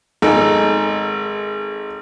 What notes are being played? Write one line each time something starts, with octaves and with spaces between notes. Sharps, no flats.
G#1 D#4 A4